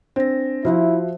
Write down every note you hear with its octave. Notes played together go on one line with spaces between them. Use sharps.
C4 D4 A#6
F3 E4 F#4 C5 E5